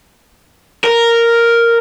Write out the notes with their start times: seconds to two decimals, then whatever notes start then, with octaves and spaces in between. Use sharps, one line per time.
0.84 A#4